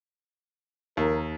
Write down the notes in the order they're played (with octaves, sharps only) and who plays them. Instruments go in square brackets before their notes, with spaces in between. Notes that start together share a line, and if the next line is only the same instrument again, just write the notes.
[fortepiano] D#2 [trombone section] A#4